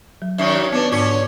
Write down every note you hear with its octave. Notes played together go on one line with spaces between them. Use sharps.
F#3
F#2 D#3 C#4 E5
B3 C#4 D4 B4
G#2 D3 C#4 C#5